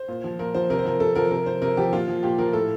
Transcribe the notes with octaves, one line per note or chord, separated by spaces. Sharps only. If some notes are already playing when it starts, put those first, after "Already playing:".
Already playing: C5
A#2
F3
A#2 A#4
F3 C5
C3 A#4
C5
F3 A#4
C3 A4
F3 A#4
C3 A#4
F3 C5
C3 A#4
F3 G4
A#2 F4
F3
A#2 G4
F3 A#4
A2 A4